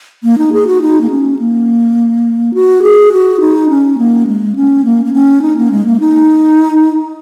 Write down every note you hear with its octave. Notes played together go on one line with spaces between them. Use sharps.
A#3
D#4
G#4
F#4
D#4
A#3
C#4
A#3
F#4
G#4
F#4
D#4
C#4
A#3
G#3
C#4
A#3
A#3
C#4
D#4
A#3
G#3
A#3
D#4